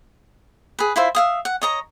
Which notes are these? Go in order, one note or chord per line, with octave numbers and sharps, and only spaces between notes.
G#4 B4
E4 F4 C5 E5
E5 F5 D#6
F#5
C#5 D#5 A#5